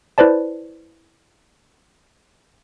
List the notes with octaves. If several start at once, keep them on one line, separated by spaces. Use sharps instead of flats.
E4 B4 C5 D5 A5